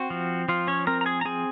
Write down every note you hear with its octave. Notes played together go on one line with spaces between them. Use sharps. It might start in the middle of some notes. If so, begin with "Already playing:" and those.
Already playing: C4 F#4
F3
F3 F4
C#4 C#5
C4 A#4 A#5
A#5
G#4 G#5
A#5
C4 G#4 G#5